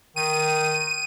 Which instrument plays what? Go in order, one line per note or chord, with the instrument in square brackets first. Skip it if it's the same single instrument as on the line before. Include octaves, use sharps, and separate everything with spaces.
[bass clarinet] D#3 [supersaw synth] D#7